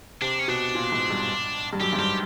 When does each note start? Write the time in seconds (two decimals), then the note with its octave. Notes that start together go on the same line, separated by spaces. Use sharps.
0.21 C3 D4
0.39 C#4
0.48 B2 D4
0.75 A#2
0.92 G#2
1.10 G2
1.73 G2
1.81 F#2 G4
1.93 G#2
1.99 G2 G4